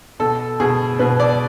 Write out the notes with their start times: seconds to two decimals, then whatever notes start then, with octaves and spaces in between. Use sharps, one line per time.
0.20 B2 A4
0.60 B2 G#4
0.99 B2 B4
1.20 D5